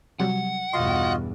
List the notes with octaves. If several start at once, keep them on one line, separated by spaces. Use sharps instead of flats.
C3 F#3 G3 F#5
B1 E2 G2 F4 F#4 D#5 C6